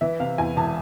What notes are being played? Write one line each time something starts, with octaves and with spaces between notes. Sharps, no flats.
E3 E5
C3 F5
E2 G#5
E1 A5